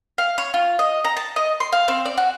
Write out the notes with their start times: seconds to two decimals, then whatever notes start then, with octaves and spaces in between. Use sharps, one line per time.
0.18 F5
0.38 C#5
0.54 F4
0.79 D#5
1.05 A#5
1.17 A5
1.36 D#5
1.60 C6
1.72 F5
1.88 C4
2.05 D5
2.17 F#4